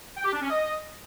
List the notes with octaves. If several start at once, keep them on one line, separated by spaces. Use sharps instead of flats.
G5
G4
D4
C#4
D#5